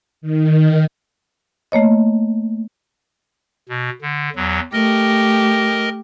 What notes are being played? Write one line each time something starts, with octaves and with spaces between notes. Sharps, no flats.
D#3
A3 A#3 C#5 D#5
B2
D3
E2 F#3
A3 G4 A#4 D#5